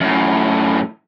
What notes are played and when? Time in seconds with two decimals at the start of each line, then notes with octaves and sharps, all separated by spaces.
0.01 F#2 A2